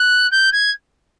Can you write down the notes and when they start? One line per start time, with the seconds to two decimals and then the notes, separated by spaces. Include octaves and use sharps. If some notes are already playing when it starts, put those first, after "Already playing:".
Already playing: F#6
0.31 G6
0.52 G#6